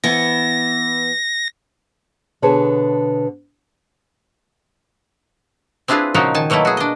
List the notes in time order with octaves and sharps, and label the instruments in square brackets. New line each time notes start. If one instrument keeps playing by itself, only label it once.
[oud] E3 B3 [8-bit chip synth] A#6
[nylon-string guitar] B2 D3 G#4 B4 C#5 A5
[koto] C4 D4 E4 F4 G#4 B4
A#2 C#3 F3 D#4 F#4 A#4
D#3 G#5 A5
B2 F#3 A3 A#3 E4
F#4 G#4
D4 D#5